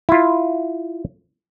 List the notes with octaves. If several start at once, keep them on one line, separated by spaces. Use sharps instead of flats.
E4 F4